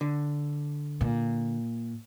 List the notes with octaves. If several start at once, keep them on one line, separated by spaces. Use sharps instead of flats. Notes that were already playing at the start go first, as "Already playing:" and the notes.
D3
A#2